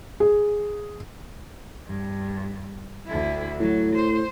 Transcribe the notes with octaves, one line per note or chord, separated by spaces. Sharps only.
G#4
G2
D2 E4
A2 F#3
C5